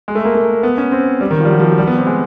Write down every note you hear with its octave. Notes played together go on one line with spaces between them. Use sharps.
G#3
A3
A#3
A#3
B3
C#4
C4
G3
D#3
F3
G3
F#3
F3
F#3
G3
B3
C4
G#3